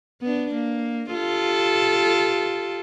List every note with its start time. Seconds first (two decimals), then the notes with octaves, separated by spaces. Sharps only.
0.22 B3 D4
0.54 A#3
1.13 F4 G4 A4